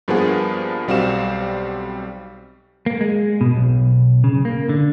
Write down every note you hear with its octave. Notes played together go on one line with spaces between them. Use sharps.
G2 F3 A#3 B3 G#4 F#5
B1 G3 C4 F#4 F5 E7
A#3
G#3
B2
B1
C#3
A#3
D3